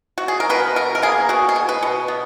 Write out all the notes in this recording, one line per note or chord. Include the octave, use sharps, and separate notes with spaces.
F#4
G#4
A#4
B2 B4
B2 A#4
A#4
A#3 G#4
B2 F#4
G#4
B2
B4
B2
B3